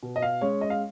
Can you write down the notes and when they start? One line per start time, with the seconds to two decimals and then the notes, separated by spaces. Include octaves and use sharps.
0.03 B2
0.16 D#5
0.22 F5
0.41 G#3 C#4 C#5
0.61 D#5
0.70 F5